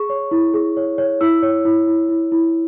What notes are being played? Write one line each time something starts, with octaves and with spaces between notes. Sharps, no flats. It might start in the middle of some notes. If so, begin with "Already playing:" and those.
Already playing: G#4 C#6
C#5
E4
G#4
C#5
C#5
E4 E6
C#5
E4
E4
E4
E4